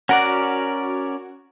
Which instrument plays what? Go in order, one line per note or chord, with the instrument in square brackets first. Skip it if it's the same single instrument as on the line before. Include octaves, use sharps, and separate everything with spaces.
[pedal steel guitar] C#4 A#4 D5 [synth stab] F#4